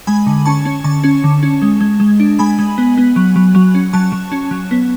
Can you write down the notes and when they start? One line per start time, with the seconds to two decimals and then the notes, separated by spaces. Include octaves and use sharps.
0.07 G#3 G#5 B5
0.27 D3
0.45 C#4 A5 C#6
0.65 C#4
0.84 D3 A5 C#6
1.04 C#4
1.24 D3
1.43 C#4
1.62 G#3
1.80 G#3
2.00 G#3
2.20 D4
2.39 G#3 G#5 B5
2.58 G#3
2.78 B3
2.97 B3
3.16 F#3
3.36 F#3
3.55 F#3
3.75 C#4
3.93 F#3 A5 C#6
4.12 F#3
4.32 C#4
4.51 F#3
4.71 B3